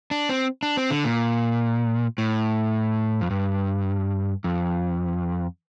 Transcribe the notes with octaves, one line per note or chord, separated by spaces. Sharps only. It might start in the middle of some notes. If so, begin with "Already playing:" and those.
D4
C4
D4
C4
D3
A#2
A2
F2
G2
F2